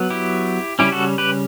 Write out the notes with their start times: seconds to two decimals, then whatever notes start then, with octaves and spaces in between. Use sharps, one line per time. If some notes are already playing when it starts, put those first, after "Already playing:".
Already playing: F#3 B3
0.10 E4 G4
0.79 C#3 G3 C#4 E4 G4
0.92 F#4 A4
1.18 G4 B4